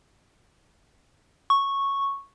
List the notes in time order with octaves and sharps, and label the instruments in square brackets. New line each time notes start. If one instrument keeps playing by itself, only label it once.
[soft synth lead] C#6